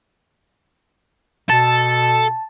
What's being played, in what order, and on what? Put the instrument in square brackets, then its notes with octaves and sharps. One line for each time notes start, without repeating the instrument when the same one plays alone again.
[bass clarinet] B2 [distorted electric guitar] A4 [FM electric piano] A5